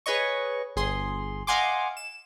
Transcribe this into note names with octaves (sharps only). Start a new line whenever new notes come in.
G#4 B4 C#5 D#5 C#6
G1 G#4 C6
D#5 F5 F#5 G#5 C6 D6
E7